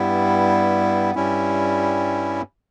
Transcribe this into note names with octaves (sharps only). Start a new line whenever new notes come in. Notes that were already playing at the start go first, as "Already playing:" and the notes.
Already playing: G2 G3 B3 E4
G2 G3 C#4 E4